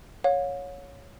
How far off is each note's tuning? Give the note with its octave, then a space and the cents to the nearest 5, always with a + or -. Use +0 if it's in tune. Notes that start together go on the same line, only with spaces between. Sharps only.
C#5 +0 F5 +40